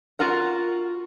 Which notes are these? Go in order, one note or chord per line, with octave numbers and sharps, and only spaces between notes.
F4 F#4 A#4 F#5